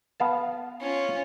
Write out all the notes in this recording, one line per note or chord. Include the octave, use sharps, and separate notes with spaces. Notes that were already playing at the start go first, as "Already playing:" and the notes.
B3 F5 A5
C#4 F4